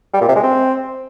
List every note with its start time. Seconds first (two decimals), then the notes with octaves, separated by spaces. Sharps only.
0.13 G3
0.21 A#2
0.28 C3
0.36 G#3
0.43 C4